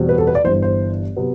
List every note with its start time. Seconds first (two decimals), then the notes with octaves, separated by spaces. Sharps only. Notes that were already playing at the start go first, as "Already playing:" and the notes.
Already playing: E2 B2 G3 C4
0.09 B4
0.18 A4
0.27 B4
0.35 D5
0.44 G1 G2 E3 C5
0.62 C5
1.16 C3 F#3 B3